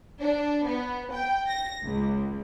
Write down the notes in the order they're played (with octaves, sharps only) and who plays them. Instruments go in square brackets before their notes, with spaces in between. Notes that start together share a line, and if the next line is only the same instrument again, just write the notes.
[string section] D4
B3
G5
A#6
C#2